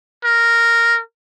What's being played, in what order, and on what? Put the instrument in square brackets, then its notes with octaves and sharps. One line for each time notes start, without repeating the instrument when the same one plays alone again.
[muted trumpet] A#4